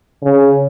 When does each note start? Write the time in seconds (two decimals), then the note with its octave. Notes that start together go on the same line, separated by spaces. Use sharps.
0.23 C#3